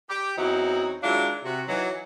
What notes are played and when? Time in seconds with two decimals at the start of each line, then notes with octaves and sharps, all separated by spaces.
0.09 G4
0.37 E2 F#3 C4 D#4 E4 F#4
1.02 D#3 F#3 G#3 D4 E4 F4
1.44 C3 F#4
1.68 E3 F#3 D#4